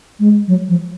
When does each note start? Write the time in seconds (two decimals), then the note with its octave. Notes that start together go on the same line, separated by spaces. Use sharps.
0.20 G#3
0.48 F#3
0.68 F3